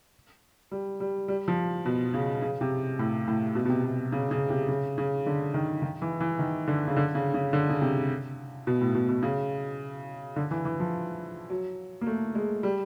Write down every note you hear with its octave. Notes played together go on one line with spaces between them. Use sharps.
G3
G3
G3
F3
B2
C#3
C#3
C3
A2
A2
B2
B2
C3
B2
C#3
C#3
C3
C#3
C#3
D3
D#3
D#3
E3
E3
D#3
D3
C#3
D3
C#3
C#3
D3
C#3
C3
B2
A2
B2
B2
C#3
D3
E3
E3
F3
F#3
A#3
A3
G#3
G3